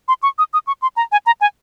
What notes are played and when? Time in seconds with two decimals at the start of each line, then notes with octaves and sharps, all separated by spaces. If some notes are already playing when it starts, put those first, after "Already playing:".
0.08 C6
0.23 C#6
0.38 D#6
0.53 D#6
0.67 C#6
0.82 C6
0.97 A#5
1.12 G#5
1.26 A#5
1.41 G#5